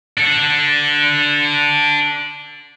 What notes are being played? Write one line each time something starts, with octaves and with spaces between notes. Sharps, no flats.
D4 A4